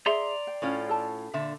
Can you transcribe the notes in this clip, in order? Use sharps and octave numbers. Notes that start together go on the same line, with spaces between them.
G#4 D5 E5 A#5 C6
G5
A2 C#4 F4
A4 A5
A#2 D3 E5